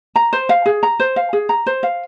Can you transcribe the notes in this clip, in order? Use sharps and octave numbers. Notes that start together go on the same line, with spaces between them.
A#5
C5
F5
G#4
A#5
C5
F5
G#4
A#5
C5
F5